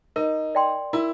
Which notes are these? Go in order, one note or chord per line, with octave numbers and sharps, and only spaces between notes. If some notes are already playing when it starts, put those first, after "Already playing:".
D#4 A#4
D5 G5 C6
E4 A#4